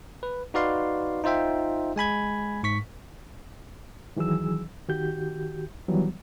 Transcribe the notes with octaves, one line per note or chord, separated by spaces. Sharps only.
B4
D#4 F#4 B4 D5 F5 C6
D#4 F4 C5 E5 G5
G#3 G#5 B5 G#6
G#2 C#6 B6
D#3 E3 F#3 G#4 E6
D#3 F#4 G4 G6
D#3 E3 F#3 G3 B3